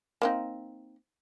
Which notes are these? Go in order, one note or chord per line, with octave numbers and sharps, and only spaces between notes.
A#3 C4 D#4